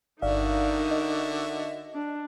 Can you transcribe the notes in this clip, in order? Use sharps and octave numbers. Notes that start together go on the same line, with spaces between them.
G1 D3 D#4 F#4 A#4 D5 E5 F5
D#5
D4